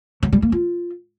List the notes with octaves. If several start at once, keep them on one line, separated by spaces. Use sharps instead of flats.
F#3
G3
A#3
F4